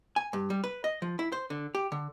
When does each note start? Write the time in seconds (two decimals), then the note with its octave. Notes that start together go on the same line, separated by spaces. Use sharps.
0.16 G#5
0.33 G2
0.50 G3
0.64 B4
0.84 D#5
1.02 F3
1.19 E4
1.32 C5
1.50 D3
1.75 G4
1.92 D3